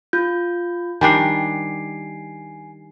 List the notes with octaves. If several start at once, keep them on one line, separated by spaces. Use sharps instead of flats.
F4 G6
D#3 G3 D4 G#5 C7